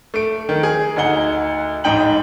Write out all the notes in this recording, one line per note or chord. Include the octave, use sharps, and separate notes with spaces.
A3 D7
D#3
G#4
D2 D#4 F#5 G7
A1 G#2 D#4 G5 F#7